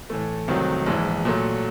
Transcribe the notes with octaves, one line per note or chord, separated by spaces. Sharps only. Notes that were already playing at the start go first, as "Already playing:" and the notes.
A2 E3 A3
C2 C3 D#3 F#3 A3
A#1 G#2 E3 G#3
A#2 F#3 A3